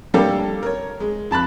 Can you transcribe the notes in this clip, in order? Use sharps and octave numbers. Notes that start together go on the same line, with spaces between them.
G3 A3 A#3 D4 G4 A4
A#4 C#5
G#3
F2 A5 B5 F#6